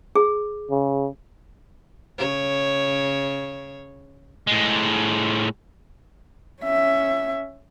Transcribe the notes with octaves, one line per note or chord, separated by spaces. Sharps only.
G#4
C#3
C#3 C#5
A2 G#3
C#4 E5